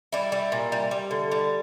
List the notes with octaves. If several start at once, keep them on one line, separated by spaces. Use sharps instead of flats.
G3 E4
G3
A#2
G3
G3
D3
G3